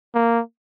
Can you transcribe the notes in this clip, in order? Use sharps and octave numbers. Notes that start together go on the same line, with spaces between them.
A#3